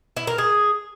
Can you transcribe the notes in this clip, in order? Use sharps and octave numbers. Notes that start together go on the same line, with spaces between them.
E4
A#4
G#4